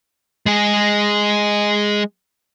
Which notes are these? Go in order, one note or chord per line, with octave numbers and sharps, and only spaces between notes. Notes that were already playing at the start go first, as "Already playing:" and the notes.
G#3 G#4